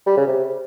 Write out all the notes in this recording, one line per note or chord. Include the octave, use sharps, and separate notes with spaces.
G3
C#3
C3